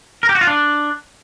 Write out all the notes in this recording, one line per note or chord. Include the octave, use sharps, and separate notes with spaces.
A#4
G4
F#4
F4
D4